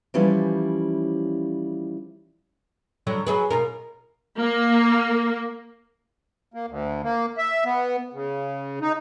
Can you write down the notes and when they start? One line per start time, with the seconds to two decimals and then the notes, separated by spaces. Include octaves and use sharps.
0.14 E3 F3 G3 C#4 E4
3.07 D3 F#3 G3
3.27 F#3 G#4 B4
3.51 B2 F4 A#4
4.38 A#3
6.54 A#3
6.68 D2
7.04 A#3
7.38 E5
7.65 B3
8.13 C#3
8.81 D#4